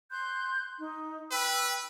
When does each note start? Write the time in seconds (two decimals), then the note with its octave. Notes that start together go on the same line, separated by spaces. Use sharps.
0.11 C6 F#6 G6
0.78 D#4
1.31 B4 G5 E6